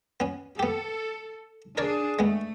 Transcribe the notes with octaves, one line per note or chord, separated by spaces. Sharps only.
B3 C#4
B3 G4 A4
D4 G#4 A#4 C#5 D5
G#3 A3 B3